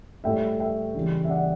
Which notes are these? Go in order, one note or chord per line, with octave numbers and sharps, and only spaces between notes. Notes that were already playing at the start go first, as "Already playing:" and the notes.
A2 G3 E5 G5
E5 G5
C#3 E3 G3
E5
D5 F#5